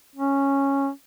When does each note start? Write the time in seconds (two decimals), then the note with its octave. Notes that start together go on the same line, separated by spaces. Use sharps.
0.16 C#4